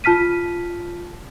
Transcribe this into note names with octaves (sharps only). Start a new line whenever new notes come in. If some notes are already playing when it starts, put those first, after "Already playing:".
F4 A5 F6 B6 D#7